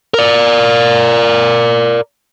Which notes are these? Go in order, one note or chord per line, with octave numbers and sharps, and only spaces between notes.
A#4 D5